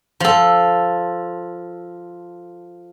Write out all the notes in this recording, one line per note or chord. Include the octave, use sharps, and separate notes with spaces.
F3 A4